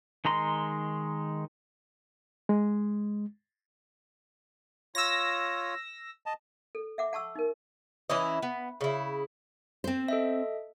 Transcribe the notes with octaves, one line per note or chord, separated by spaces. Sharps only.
D#3 G#3 A#5 C6
G#3
F4 C#5 E6 A#6
D#5 A5
A4
E5 F#5 D6
F#5 A5 C#6 E6
D#4 A#4
E3 C#4 E4 D#5
B3
C#3 E4
C4 C5
A4 D#5 E5